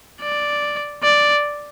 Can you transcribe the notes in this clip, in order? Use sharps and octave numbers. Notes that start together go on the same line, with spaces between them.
D5
D5